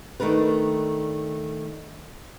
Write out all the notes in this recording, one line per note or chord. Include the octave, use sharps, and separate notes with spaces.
D#3 A3 D4 A#4 B4